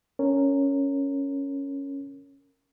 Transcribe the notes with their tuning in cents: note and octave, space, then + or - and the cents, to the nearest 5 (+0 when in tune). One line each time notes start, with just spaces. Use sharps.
C#4 +0 A#4 -10